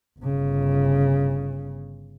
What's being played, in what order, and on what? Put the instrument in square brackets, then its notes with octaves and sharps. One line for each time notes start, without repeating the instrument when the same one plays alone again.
[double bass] G1 C#3